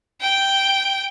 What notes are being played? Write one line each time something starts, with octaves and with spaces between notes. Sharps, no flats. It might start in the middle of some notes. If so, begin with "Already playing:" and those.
G5